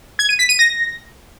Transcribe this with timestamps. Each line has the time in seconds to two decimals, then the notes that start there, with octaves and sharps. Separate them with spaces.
0.19 G#6
0.29 D#7
0.39 B6
0.49 D#7
0.59 A#6